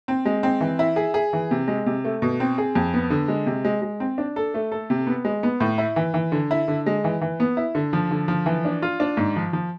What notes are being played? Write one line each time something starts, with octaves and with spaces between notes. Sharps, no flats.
C4
G#3
C4
E3
E4
G#4
G#4
E3
C3
G#3
C3
A3
B2
C4
G#4
F2
B3
D3
G#3
C3
G#3
G#3
C4
D4
A4
A3
A4
C3
B3
G#3
B3
A2
E4
E3
E3
D3
E4
D3
G#3
E3
E3
B3
E4
D3
F3
D3
F3
E3
D4
F4
D4
G#2
F3
F3